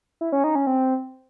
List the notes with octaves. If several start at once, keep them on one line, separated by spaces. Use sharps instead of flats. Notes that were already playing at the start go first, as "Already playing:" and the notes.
E4
C#4
D#4
C#4
C4